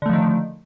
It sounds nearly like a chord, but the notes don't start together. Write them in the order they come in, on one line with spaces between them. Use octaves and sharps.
D3 A3 F3 D#3